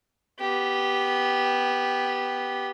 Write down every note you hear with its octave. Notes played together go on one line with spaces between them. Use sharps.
B3 G4